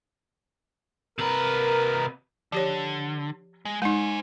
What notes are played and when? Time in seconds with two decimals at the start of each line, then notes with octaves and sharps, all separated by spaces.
1.19 C3 A#4 B4
2.52 D3 F3 G4 C#5
3.65 G#3
3.82 G#3 D#4 C5 G#5